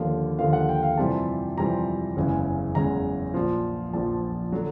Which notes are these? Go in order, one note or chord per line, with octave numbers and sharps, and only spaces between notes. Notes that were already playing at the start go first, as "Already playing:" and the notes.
Already playing: D#2 D3 F3 A#3 F5
D#2 D3 F3 A#3 F5
F#5
G5
F5
F2 C3 E3 G3 C4 A5
F2 C3 E3 G3 C4 A#5
F#1 E2 C#3 E3 G#3
F#1 E2 C#3 E3 G#3 A#5
A#1 A#2 F3
A#1 A#2 F3 A5
D3 F#3